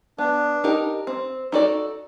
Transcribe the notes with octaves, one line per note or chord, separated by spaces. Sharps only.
B3 D4
D#4 G4 A#4
C4
D#4 F#4 A4 D5